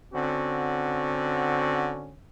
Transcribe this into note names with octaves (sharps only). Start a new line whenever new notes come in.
D3 C4 C#4 F#4